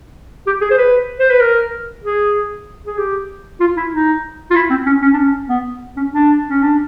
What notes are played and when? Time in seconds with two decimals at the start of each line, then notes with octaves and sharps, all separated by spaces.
0.46 G4
0.61 G#4
0.70 C5
0.77 B4
1.19 C5
1.30 B4
1.40 A#4
2.03 G#4
2.86 G#4
2.98 G4
3.60 F4
3.76 E4
3.92 D#4
4.50 F4
4.55 E4
4.70 C4
4.86 C#4
5.01 C#4
5.13 D4
5.18 C#4
5.49 B3
5.96 C#4
6.12 D4
6.48 C#4
6.62 D4